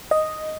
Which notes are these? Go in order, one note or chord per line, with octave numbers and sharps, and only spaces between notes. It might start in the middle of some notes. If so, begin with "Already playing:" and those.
D#5